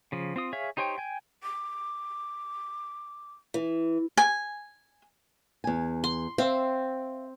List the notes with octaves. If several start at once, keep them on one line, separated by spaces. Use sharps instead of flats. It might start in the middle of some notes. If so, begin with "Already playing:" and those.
C#3 F3
C4 F4 D#6
G#4 C#5 E5 F5
D#4 G4 C5 C#5 G5
G5 G#5
D6
E3
G#5
E2 G#5
C6
C4 C5 E5 F5